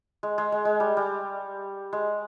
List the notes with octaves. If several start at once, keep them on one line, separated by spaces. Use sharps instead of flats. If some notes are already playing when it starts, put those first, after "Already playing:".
G#3
G#3
G#3
G#3
G3
G3
G#3